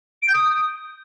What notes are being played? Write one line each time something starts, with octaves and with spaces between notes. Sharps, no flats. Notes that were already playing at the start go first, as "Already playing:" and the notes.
D7
G6
D#6